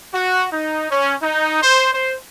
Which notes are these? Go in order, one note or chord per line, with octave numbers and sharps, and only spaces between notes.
F#4
D#4
C#4
D#4
C5
C5